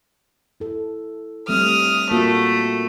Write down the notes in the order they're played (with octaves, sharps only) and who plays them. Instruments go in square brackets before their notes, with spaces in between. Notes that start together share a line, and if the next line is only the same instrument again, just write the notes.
[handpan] E4 A4
[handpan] G3 A3 C4 [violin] D#6 F6
[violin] A3 [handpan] A#3 F4 F#4